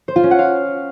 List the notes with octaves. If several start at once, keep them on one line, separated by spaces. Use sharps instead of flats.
C5
F4
C#4
F#5
F5